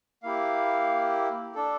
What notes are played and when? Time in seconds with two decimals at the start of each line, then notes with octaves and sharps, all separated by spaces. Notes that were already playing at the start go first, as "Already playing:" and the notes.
0.23 A#3 E4 G4 F5
1.55 D4 A4